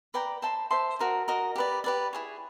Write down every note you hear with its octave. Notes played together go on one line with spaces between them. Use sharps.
B4 D5 G5 A#5
C5 E5 A5 C6
C5 E5 A5 C6
F#4 A#4 D#5
F#4 A#4 D#5
G4 B4 D5
G4 B4 D5
E4 G#4 C#5